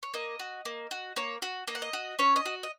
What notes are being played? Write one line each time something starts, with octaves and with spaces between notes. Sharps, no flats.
C#5
A#3 D#5
F#4
A#3
F#4
A#3 C#5
F#4
A#3 D#5
F#5
D#5
F#4
C#4 C#5
D#5
F#4
D#5